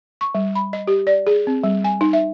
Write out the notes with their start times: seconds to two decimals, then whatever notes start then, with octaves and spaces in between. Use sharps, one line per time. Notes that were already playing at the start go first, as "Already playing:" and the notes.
0.21 C#6
0.35 G3
0.55 B5
0.73 D#5
0.87 G4
1.07 D5
1.27 G#4
1.47 C4
1.64 G3
1.84 G#5
2.01 D#4
2.13 E5